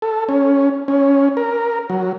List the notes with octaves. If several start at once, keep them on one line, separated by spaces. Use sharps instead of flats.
A4
C#4
C#4
A#4
F#3